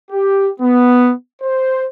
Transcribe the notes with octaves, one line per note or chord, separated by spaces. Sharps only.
G4
B3
C5